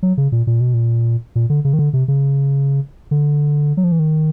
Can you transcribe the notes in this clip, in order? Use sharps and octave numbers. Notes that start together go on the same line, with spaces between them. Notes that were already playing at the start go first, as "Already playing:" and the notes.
F#3
C#3
A#2
A#2
B2
A#2
A#2
D3
C#3
D#3
D3
C3
C#3
D3
F#3
F3
E3
D#3